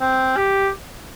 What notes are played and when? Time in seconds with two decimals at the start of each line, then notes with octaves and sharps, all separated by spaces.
0.01 C4
0.36 G4